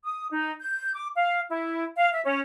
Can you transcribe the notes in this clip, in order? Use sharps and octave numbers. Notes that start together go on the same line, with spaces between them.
D#6
D#4
G6
D6
F5
E4
F5
E5
C#4